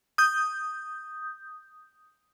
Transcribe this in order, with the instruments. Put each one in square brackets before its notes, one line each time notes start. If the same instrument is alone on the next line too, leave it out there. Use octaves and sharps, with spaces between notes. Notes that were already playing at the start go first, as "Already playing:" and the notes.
[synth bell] D#6 G6